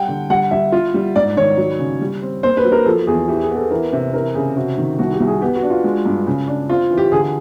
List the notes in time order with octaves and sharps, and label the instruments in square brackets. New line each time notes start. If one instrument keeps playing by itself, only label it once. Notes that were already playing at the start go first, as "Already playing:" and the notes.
Already playing: [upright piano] G3 [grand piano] F#5 G5
[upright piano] D3
[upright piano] G3 [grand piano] F#5
[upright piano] G3 [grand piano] E5
[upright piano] F4
G3
[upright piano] G#2 [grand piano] D5
[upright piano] D#3 [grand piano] C#5
[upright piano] F#3
C#3
G3
C4
[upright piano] A#3 [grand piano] C5
[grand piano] B4
[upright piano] F#3
[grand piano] A#4
[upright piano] F3 [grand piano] A4
[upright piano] E2 [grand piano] G#4
[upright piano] E3 [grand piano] G4
[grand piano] G#4
[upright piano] B3
[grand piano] A4
[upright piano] E3 [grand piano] A#4
[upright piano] C3
[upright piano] E3 [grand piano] A#4
[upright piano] C#3 [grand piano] G#4
[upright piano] C3 [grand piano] F#4
[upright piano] D#3
[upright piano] C2 [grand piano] F#4
[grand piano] G4
[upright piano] C2
[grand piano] G#4
[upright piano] B3 [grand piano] G4
[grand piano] F#4
[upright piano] D4
[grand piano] F4
[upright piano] G#3
G2
C#3
D4
[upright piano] C4 [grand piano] F4
[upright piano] E3
[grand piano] G4
[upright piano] D3 [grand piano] G#4